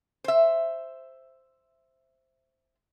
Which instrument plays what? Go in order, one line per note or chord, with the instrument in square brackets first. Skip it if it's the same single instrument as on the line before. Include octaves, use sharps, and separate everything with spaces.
[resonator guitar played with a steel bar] C5 E5